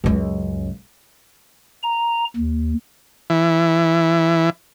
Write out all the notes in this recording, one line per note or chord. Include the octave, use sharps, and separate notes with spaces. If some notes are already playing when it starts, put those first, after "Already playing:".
C#2 F#2
A#5
D#2
E3